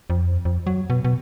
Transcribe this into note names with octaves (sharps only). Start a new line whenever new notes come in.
F2
F2
F#3
B2
B2